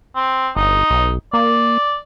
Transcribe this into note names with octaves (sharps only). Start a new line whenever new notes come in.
C4
G1 D#4
B1
A#3 D5